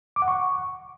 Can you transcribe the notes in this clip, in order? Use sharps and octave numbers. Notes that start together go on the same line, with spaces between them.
D6
F#5
C#6